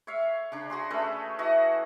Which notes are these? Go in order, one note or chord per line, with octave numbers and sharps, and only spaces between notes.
C#5 E5 F5
C#3 D4
D4 F#4 G#4 C6
A3 C#4 G#4 B4
E3 F#4 D#5